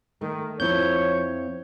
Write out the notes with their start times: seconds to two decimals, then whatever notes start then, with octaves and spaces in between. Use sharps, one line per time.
0.21 D#3 A3
0.60 F2 F3 C4 E4 C#5 G6